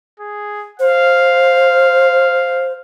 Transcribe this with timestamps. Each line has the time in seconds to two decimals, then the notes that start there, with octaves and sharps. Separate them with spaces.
0.20 G#4
0.79 C5 F5